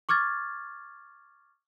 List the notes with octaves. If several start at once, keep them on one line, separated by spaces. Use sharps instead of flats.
C#6 D6 F6 G#6 A6